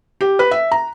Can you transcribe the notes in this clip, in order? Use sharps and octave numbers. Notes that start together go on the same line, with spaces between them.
G4
B4
E5
A#5